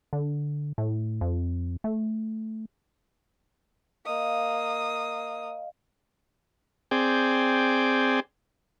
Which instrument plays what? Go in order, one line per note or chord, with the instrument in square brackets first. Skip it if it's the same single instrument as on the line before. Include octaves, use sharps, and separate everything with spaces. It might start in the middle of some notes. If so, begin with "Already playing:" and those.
[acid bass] D3
A2
F2
A3
[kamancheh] A#3 D#6 [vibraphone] D#5 F5
[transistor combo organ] C4 G#4 D5 G5